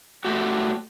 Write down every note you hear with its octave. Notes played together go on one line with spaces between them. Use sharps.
A3 F#4 G4